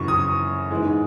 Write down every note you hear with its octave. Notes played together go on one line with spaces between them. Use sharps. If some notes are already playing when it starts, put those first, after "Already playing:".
Already playing: F#2 C#3 E3 C#6
D#6
G#2 E3 G#3